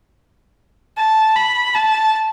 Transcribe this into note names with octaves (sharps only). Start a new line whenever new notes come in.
A5
B5
A5